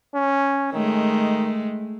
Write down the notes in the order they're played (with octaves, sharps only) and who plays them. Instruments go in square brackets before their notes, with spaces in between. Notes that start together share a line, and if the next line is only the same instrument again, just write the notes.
[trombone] C#4
[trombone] D#3 [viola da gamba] G#3 A3